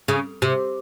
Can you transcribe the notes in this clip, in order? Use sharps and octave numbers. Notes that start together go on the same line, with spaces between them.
C#3
C3